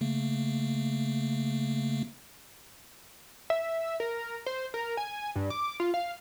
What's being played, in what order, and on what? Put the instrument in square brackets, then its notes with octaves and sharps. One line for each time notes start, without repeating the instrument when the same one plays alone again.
[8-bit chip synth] C#3 A3 A#3
[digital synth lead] E5
A#4
C5
A#4
G#5
G2
D6
F4
F5